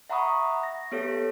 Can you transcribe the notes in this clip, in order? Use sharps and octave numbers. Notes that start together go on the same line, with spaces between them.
E5 F#5 A#5 B5 C#6 D#6
E5
A#6
B3 G4 A4 C#5